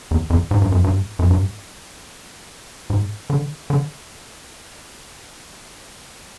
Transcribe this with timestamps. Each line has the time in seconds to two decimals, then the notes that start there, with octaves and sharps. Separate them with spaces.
0.11 E2
0.30 F2
0.51 G#2
0.62 G2
0.72 F#2
0.84 G2
1.19 F#2
1.31 G2
2.90 G#2
3.30 D3
3.70 D3